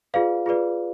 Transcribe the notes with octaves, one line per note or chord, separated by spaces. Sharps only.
F4 G#4 B4 D5 F5
F4 G#4 B4 D5